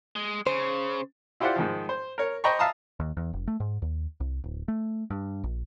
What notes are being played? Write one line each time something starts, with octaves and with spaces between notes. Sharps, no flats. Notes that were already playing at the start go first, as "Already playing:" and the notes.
G#3
C#3 C5
E4 F4 G4 C5 D5 F#5
G#2 D#3 F3
C5
A#4 C#5
C5 D#5 G5 A#5 B5 C#6
E5 F5 A5 A#5 D#6
D#2
E2
F1
A3
G#2
D#2
C2
D1
A3
G2
A#1